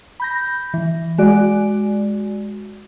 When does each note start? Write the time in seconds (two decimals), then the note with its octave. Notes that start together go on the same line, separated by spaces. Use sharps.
0.20 B5 G6 A#6
0.74 E3
1.18 G#3 F#4 D5